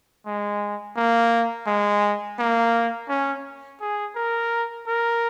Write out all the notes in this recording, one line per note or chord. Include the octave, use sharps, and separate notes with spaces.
G#3
A#3
G#3
A#3
C#4
G#4
A#4
A#4